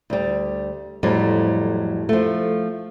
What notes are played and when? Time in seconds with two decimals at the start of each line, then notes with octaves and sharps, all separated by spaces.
0.10 D2 G3
1.03 F2 A2 F#3 G3
2.09 F3 A3